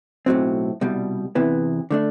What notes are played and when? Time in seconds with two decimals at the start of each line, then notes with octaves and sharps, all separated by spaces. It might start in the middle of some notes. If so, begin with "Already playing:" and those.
0.26 B1 A2 F#3 C4
0.81 C2 B2 G3
1.35 E2 C3 E3 B3
1.90 D3 A3 D4